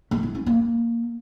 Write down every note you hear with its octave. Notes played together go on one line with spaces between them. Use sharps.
A3
E4
C#4
A#3